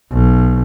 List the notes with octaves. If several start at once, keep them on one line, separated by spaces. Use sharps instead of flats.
B1